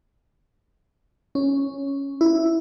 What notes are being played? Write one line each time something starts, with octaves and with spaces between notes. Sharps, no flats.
C#4
E4